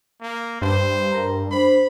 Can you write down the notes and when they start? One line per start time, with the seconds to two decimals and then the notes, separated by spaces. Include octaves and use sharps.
0.21 A#3
0.62 G2 C5
1.11 A#4 A#5
1.51 D4 C5 B5